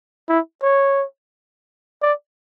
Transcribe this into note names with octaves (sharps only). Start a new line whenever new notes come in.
E4
C#5
D5